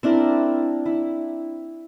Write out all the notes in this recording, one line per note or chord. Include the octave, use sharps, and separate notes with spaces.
C4 D4 E4 A#4
E4